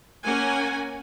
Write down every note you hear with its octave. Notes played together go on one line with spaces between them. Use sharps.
A#3 C#4 A#4 F#5 G#5